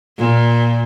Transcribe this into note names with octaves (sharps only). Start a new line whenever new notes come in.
A#2